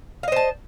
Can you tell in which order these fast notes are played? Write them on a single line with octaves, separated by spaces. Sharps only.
F5 D#5 C5 A5